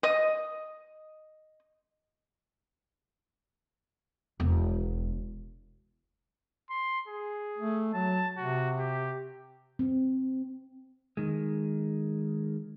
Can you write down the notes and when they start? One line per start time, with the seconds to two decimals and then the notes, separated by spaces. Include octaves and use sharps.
0.03 D#5 D#6
4.40 E1
6.70 C6
7.08 G#4
7.58 A3
7.94 F#3 A5
8.37 C3 F#4
8.79 G4
9.79 C4
11.17 D#3 G#3